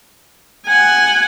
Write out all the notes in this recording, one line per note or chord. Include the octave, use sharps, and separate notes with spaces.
F#5 G#5